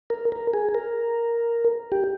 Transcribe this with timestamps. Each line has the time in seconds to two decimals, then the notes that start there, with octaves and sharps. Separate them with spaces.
0.10 A#4
0.32 A#4
0.54 G#4
0.74 A#4
1.92 G4